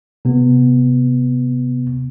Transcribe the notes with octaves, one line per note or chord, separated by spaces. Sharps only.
C3 B3